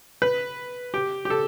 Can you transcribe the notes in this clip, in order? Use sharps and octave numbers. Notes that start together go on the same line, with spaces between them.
B4
G4
G4
A4